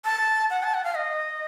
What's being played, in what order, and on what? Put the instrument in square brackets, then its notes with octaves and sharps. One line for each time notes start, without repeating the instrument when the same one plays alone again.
[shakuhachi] A5
F#5
A5
F#5
F5
D#5